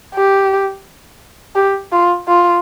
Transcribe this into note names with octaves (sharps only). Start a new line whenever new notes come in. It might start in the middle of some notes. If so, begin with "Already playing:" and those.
G4
G4
F4
F4